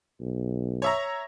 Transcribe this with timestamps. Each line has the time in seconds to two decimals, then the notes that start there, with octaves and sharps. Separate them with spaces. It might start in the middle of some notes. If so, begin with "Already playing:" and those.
0.21 B1
0.82 C#5 E5 A#5